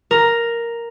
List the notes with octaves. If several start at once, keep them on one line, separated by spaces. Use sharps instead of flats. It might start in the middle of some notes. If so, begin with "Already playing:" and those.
A#4